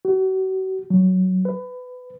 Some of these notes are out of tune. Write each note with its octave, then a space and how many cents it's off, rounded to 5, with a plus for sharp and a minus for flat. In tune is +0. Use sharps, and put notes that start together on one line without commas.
F#4 +40
F#3 +5
B4 +20